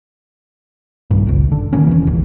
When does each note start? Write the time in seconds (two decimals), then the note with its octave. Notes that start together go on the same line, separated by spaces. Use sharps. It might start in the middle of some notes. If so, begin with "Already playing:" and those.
1.10 A#1 G2
1.26 G1 C#2
1.52 D3
1.73 A#2 D#3 A#3 C#4
1.87 E1 F2 E3
2.07 D1 G#1 D#2